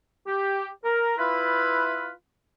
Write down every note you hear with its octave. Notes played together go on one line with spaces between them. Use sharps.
G4
A#4
E4 F4 B4